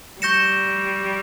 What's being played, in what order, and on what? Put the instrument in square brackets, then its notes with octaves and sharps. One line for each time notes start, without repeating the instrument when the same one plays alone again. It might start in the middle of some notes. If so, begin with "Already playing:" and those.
[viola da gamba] G3 [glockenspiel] C#6 G6 A#6 C#7 E7